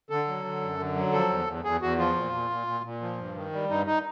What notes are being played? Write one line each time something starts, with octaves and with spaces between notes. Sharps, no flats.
D3 A4
F#3
D3
F#2
D3
F#3
F3 A4
E2
E2
E2 G#4
E2 F#4
F3 F4
A#2
A#2
A#2
A#2
A#2
F3
G2
D#3
G3
G2 D#4
D#4